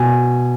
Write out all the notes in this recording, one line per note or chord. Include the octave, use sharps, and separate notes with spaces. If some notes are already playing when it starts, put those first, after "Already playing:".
Already playing: B2 G#5